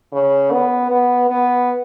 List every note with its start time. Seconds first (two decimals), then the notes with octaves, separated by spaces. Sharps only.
0.12 C#3
0.52 B3
0.90 B3
1.30 B3